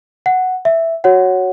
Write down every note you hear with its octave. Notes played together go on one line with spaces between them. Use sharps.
F#5
E5
F#4 C#5 F#5